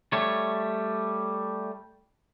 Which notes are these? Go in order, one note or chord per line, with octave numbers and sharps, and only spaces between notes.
G3 A3 C#5